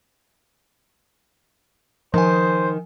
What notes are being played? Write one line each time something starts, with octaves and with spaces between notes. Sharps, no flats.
D#3 F3 C5 G#5